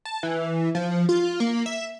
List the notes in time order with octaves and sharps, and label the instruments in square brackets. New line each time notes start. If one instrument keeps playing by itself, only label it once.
[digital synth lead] A5
E3
F3
F4
A#3
E5